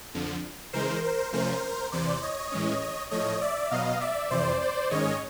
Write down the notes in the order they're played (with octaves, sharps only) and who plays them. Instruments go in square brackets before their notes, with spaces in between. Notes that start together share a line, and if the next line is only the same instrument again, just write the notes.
[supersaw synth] F2 D3 F3
C#3 E3 G#3 A#4 C5
A#4 C5
C3 F3 A3 C#4 A#4 C5
E2 C3 E3 C5 D5
C#5 D#5
A2 E3 G#3 C#4
A2 F3 A3 C#5 D#5
D5 E5
B2 F#3 B3 D#5 F5
D5 E5
F2 C3 E3 C5 D5
C5 D5
G#2 D#3 G#3 C#4 C#5 D#5